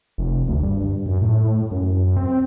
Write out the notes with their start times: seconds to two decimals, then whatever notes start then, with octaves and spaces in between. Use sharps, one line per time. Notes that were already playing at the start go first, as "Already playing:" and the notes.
0.18 F1
0.48 D2
0.63 G2
1.06 F#2
1.21 A2
1.71 F#2
2.17 C4